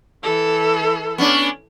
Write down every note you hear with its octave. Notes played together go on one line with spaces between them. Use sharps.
E3 A4
B3 C#4 D4